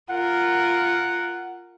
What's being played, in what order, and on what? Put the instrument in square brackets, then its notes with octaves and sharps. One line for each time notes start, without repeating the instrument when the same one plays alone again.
[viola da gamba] F4 A#4 [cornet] F#5